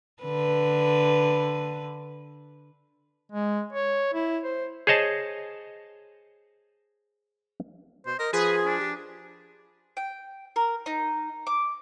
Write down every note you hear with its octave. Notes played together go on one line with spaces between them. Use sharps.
D3 B4
G#3
C#5
E4
C5
G#4 C5 C#5 D#5 A5
B2 C5
A#4 D#5
F3 G#4 B4
D4
G4
G5
A#4
D#4
D6